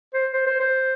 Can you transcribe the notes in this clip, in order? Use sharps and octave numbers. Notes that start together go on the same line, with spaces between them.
C5
C5
C5
C5